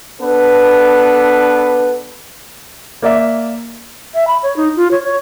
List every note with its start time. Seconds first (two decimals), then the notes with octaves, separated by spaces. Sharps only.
0.21 B3 D4 A4 B4
3.02 A#3 D5 E5
4.15 E5
4.28 B5
4.43 C#5
4.57 D#4
4.76 F4
4.91 C#5
5.04 C#5